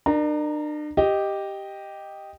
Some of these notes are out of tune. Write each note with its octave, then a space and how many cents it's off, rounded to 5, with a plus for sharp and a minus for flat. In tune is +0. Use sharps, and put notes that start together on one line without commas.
D4 +40 A#4 +0 A#5 +0
G4 +0 D#5 +0